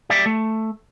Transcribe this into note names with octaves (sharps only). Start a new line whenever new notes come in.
G4 D5 E5
A3